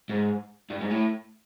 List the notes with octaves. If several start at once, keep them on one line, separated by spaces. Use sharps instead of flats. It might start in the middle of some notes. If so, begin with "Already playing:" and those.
G#2
G2
G#2
A2